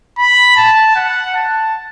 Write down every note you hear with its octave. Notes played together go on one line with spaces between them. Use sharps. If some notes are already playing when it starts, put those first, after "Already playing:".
B5
A5
F#5
A5